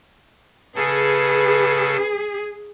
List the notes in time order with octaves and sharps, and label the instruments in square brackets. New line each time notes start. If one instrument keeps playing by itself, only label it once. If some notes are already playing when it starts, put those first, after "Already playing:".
[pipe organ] C#3 A4 [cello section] G#4 [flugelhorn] B4